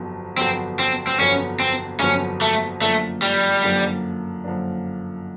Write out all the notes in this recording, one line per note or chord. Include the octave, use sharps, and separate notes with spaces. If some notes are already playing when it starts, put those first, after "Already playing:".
Already playing: G1 F2 D3 F#3 B3
G1 F2 D3 F#3 B3 C4
C4
C4
G1 F2 D3 F#3 B3 C#4
C4
G1 F2 D3 F#3 B3 C#4
A3
F#2 D3 F3 A3 A#3 D4
G3
F#2 D3 F3 A#3 D4
F#2 D3 F3 A#3 D4